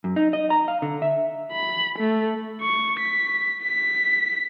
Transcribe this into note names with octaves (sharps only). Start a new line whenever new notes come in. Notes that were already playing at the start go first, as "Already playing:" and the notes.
F#2
D#4
D#5
A#5
F5
D3
E5
B5
A3
C#6
B6
B6